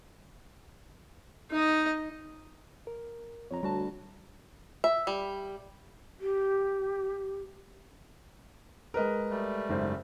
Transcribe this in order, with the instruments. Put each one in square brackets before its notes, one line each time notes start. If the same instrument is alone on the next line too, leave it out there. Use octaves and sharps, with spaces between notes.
[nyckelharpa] D#4 D#5
[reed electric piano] A#4
[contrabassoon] F2 [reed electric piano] C#5 A#5
[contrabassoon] D2 [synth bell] G3 F#4 A5
[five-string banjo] E5
G3
[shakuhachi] G4
[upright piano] G#3 F6 [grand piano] A#4 B4 D#5
[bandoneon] G3 A3
[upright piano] F#1 G#2 C5